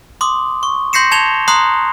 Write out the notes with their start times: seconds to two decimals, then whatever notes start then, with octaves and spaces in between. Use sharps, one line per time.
0.21 C6 D6 D#6
0.63 C#6
0.93 C6 G6 A#6 C7 C#7 E7
1.12 A5 G#6 C#7 E7 F7 G7
1.48 A#5 C6 D#6 F#6 C7